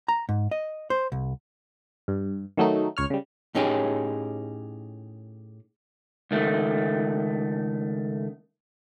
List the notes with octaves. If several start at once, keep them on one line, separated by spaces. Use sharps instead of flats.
A#5
G#2
D#5
C5
C2
G2
D#3 F#3 A3 D#4
C#2 C#5 F6
C#3 G3
A2 C#4 D#4 G4 G#4
C#2 D#3 A3